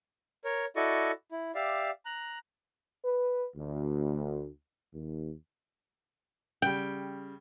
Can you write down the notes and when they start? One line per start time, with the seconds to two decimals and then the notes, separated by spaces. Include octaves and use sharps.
0.44 A#4 C#5
0.76 E4 F#4 A4 D5 D#5 C#6
1.31 E4
1.55 G4 D5 E5 F5
2.05 A#5 F#6
3.04 B4
3.56 D2
4.94 D#2
6.62 C#3 G3 G5